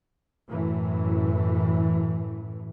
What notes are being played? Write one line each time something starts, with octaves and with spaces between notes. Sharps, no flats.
F#2 A2 E3